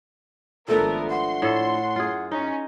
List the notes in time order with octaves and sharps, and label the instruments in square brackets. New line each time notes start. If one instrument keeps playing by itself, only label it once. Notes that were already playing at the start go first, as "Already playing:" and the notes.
[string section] G#1 B3 A#4 [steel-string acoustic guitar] F3 A3 D4 [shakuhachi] A4
[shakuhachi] F#5 [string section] C6
[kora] A2 A4
[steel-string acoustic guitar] F#2 [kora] F4 G#4
[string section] C#4 [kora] D#4